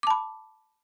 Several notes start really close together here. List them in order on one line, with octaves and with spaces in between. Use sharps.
D6 A5 B5